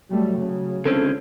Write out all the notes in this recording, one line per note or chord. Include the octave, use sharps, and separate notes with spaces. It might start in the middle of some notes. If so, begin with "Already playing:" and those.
F#3 G3 A3
C#3
C#2 D3 C4 C#4 A4